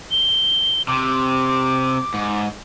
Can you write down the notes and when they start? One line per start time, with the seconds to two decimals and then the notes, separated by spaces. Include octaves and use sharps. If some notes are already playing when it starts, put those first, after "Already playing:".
0.11 G7
0.88 C3 D6
2.14 G#2